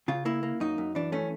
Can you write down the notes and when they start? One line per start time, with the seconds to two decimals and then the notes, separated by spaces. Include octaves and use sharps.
0.08 C#3 F4
0.25 A#3 E4
0.43 A#3
0.60 F#2 D#4
0.78 F#2
0.95 E3 D4
1.12 A3 C#4